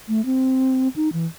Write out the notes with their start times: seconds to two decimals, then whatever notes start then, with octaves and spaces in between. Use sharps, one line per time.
0.08 A3
0.25 C4
0.96 D#4
1.13 E3